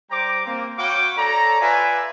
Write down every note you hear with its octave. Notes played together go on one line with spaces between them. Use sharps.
G3 C5 G5 A#5 D6
A#3 C4
F#4 C#5 F5 G5 B5 D6
A4 C#5 D5 A#5
F4 B4 D5 E5 G#5